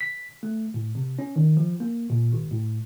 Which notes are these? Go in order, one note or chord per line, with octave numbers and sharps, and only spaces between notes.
B6
A3
A2
C3
C#4
D#3
F3
A#3
A#2
G#1
A2